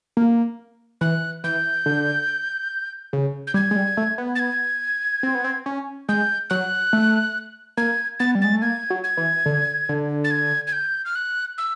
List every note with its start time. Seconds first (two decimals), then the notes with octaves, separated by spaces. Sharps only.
0.17 A#3
1.01 E3 F#6
1.44 E3 G6
1.86 D3
3.13 C#3
3.47 G6
3.54 G3 G#6
3.71 G#3
3.76 G3
3.97 A3
4.18 B3
4.35 A6
4.39 G#6
5.23 C4
5.35 B3
5.44 C4
5.66 C#4
6.09 G#3 G6
6.50 F#3 F#6
6.93 A3
7.77 A#3 G#6
8.20 B3 A6
8.35 G3
8.42 G#3 A6
8.53 A3
8.62 A#3 G#6
8.90 F#3
9.04 G#6
9.17 E3
9.46 D3
9.89 D3
10.24 A6
10.31 G#6
10.67 G#6
10.73 G6
11.05 F6
11.15 F#6
11.58 E6